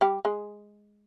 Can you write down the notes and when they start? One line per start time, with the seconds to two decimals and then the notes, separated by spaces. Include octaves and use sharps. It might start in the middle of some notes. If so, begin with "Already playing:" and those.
0.01 G3 G4
0.25 G#3 G#4